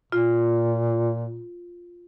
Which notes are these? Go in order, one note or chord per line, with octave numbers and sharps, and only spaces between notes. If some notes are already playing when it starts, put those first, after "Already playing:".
A#2 F4